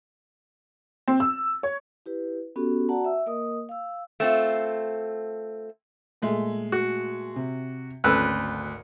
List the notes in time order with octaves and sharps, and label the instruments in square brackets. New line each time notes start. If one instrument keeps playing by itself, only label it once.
[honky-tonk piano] C4
E6
C#5
[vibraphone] E4 G4 B4
B3 C#4 F#4 G4 A4
F#4 D5 F#5 A5 A#5
E5 E6
A#3 A#4 D#5 D#6
F5 E6
[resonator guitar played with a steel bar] A3 C4 F4
[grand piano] A#2 G#3 A3
[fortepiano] F#4
[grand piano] C3
[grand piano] G#1 C#4 A4 [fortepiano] D2 B4 E6